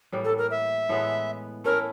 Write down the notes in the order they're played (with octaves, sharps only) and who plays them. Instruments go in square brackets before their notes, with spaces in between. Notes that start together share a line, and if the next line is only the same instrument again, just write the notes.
[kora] A2 E3 G3 A#3
[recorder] A4
A#4
E5
[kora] A2 E3 G#3 B3
[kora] A3 C#4 E4 [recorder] A#4